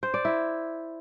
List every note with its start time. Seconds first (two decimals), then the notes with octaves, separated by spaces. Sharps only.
0.03 C5
0.14 D5
0.25 E4